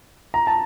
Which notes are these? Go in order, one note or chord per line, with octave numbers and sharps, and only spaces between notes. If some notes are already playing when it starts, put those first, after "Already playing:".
A#5
A5